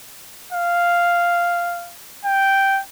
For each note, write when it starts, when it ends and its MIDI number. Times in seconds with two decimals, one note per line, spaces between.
0.53 1.92 77
2.25 2.81 79